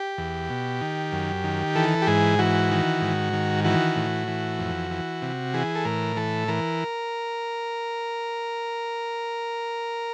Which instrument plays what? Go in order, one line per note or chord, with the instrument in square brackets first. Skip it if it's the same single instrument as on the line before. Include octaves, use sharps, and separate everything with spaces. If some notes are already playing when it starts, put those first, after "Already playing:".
Already playing: [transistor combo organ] G4
E2
B2
D#3
F#2
D#3
E3 A4
G4
G#2 G#4
E3 F#4
D#3
G#2
D#3
E3 F#4
A2
E3
F2
E3
C3
E3 G#4
A4
A2 A#4
E3 A4
E3 A#4